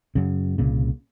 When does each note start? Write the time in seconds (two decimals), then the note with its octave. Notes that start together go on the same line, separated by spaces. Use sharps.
0.15 F#2 C#3
0.58 C2 A#2 C#3